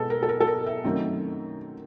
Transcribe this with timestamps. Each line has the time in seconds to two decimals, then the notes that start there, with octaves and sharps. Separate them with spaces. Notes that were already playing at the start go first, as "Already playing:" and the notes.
Already playing: B2 G#3 B3 A4
0.10 A#4
0.23 A4
0.29 A#4
0.40 A4
0.47 A#4
0.66 E5
0.84 F#2 D#3 F#3 A3 C4